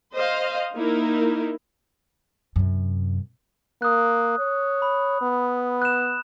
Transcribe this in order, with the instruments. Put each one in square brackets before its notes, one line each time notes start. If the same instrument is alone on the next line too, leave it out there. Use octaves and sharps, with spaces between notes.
[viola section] C5 D#5 F5
A#3 D#4 E4 A#4
[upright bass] F#2 C3
[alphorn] A#3 [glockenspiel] D#6 F#6
[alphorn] C#5
[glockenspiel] B5
[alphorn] B3
[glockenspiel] F#6 E7